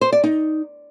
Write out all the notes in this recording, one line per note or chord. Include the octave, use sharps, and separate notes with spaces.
C5
D5
D#4